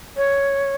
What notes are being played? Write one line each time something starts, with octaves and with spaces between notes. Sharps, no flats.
C#5